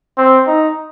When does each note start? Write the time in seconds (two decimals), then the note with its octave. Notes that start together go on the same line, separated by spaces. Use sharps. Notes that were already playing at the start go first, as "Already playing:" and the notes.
0.18 C4
0.47 D#4